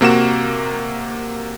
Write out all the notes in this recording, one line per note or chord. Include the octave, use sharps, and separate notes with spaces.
C3 A#3 F#4 E7